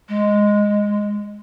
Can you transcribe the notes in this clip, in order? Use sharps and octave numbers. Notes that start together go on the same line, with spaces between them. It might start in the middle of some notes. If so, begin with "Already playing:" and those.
G#3